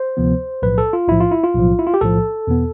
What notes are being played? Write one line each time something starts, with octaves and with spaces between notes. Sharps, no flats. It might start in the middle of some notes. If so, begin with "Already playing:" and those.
Already playing: C5
D2 C3 F3 B3
B1 A2 F3 B4
A4
F4
B1 A2 F3 E4
F4
E4
F4
B1 A2 F3
E4
F4
G4
B1 A2 F3 A4
E2 B2 B3